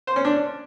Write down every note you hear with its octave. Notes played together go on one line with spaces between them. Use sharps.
C5
C#4
D4